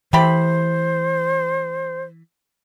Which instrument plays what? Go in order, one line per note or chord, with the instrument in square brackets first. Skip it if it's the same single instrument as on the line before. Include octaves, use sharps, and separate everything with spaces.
[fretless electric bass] E3 [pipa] A3 G4 B5 [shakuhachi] C5